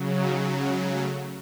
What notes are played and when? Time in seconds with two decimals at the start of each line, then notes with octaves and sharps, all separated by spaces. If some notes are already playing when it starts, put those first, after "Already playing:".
Already playing: C#3 F#3
0.22 D#4
0.58 G#3
0.93 A3